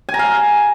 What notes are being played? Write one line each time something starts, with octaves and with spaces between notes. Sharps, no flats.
G#5
A#5
F5